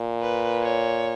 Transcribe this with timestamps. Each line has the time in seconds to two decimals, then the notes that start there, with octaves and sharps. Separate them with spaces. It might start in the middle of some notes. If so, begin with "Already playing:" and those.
Already playing: A#2
0.21 B4
0.62 C#5